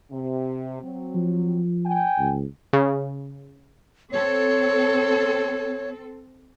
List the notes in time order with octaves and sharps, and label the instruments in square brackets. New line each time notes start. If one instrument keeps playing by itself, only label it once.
[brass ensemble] C3
F#3 C4
[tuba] F3
[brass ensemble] G5 G#5
[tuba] C#2
[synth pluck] C#3
[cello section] C4 A4 [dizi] C#5